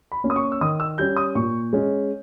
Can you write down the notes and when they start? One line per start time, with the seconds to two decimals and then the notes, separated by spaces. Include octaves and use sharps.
0.12 B5
0.24 A#3 C#4
0.30 D#6
0.36 C#6
0.52 E6
0.61 D#3 D#6
0.80 E6
0.98 G3 C#4 G6
1.17 D#6
1.35 A#2 C#6
1.73 G#3 C#4